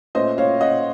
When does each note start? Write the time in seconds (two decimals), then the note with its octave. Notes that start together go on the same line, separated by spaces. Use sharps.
0.15 A#2 A3 C#4 C5 D#5
0.38 C#5 F5
0.61 D#5 F#5